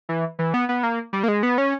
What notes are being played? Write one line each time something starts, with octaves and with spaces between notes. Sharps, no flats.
E3
E3
B3
B3
A#3
G3
A#3
G#3
B3
C#4